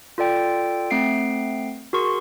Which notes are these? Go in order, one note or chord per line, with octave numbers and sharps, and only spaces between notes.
F4 A4 D5 G5
A3 C4 F#5 C7 D7
F#4 G#4 A#4 C6 C#6